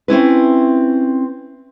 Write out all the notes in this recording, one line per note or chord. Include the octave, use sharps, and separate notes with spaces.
C4 C#4 E4 B4